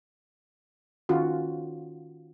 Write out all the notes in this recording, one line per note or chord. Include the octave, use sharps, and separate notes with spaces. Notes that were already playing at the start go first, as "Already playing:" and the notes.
D#3 C#4 F4 F#4